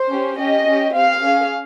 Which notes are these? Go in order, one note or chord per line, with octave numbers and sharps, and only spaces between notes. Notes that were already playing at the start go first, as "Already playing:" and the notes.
Already playing: C5
C#4 G4
C#4 G4 D#5
C#4 G4
C4 G4 F5
C#4 G#4